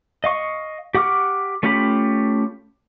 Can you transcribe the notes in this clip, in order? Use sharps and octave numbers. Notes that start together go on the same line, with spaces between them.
D#5 F5 C#6
G4 F#5 C#6 D6 F6
A3 C#4 F4 G4 B5